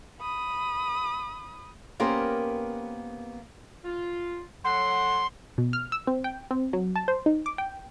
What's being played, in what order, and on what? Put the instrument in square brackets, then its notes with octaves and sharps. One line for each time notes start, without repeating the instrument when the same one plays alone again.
[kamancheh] B5 D#6
[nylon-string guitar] A#3 B3 C#4 G4 A#4 C5
[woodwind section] F4
[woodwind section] F#3 A4 F#5 [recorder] C6
[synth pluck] B2
F6
E6
C4
G5
C4
F#3
A5
C5
D#4
D6
G5